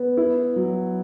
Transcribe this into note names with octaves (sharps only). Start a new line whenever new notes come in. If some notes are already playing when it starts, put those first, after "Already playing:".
Already playing: B3
E4
F#3